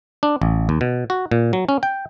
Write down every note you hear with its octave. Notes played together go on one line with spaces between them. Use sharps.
D4
A1
D#2
B2
F#4
A#2
F#3
C#4
G5